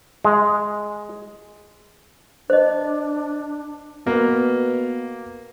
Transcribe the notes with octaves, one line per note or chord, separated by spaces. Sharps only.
G#3
D4 C5 D#5
B2 A#3 B3 B4